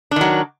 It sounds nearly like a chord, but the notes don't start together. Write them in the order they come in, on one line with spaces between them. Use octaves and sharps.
D4 D#3 F#3